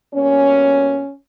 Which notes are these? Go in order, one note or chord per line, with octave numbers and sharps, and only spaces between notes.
B2 G3 A#3 C#4